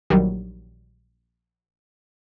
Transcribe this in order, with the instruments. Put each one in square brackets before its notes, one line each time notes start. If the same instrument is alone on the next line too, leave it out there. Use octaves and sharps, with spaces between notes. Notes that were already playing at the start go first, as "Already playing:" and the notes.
[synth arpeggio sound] A#1 D#3 F#3 G3